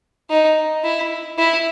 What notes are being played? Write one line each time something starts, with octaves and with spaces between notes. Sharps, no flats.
D#4
E4
E4